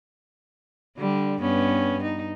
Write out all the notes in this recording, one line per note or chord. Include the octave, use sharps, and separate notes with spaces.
D3 G3
G2 B3 C#4
D#4